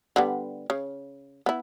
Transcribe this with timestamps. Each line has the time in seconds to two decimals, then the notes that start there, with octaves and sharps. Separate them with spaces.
0.16 D3 G3 B3
0.70 C#3
1.46 B3 E4